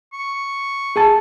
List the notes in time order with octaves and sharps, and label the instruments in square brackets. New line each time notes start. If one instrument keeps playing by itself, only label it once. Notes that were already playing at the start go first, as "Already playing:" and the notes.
[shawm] C#6
[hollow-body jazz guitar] G#4 G#5 A5